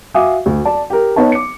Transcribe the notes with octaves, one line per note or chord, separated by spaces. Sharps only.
F#4 E5 F5 G#5 D6 D#6
D2
D5 A5
G4 A#4
B3 D#4 C#5 A5
D6 C#7